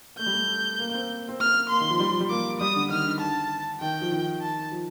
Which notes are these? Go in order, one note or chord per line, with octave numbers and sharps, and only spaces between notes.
A3 G6
G3
A3
A#3
A#3
C4
C4
A#3 F6
A#3 C6
D#3
F3
G3
F3
G3
A#3 D6
G3 D#6
D3
D#3 F6
D3
A5
D#3 G5
F3
D#3
A5
F3